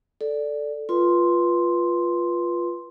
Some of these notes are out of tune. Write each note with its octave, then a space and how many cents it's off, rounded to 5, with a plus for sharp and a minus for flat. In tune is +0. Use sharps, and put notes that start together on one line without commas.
A4 +0 D5 +0
F4 +0 B4 -20 C6 +0